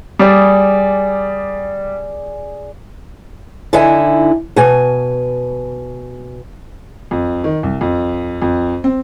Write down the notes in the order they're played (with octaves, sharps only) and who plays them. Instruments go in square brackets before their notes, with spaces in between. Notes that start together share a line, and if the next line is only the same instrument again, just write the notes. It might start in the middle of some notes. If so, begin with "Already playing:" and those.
[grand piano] G3 [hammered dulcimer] G#4 D5
[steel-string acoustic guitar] D3 D#4 E4 G#5
B2 G#5
[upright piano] F2
D#3
C2
F2
F2
C4